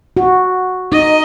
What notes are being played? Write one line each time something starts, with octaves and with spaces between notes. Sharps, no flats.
F#4
D#4 D#5